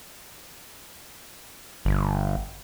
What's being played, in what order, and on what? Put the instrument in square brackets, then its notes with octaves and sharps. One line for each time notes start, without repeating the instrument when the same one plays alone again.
[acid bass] G1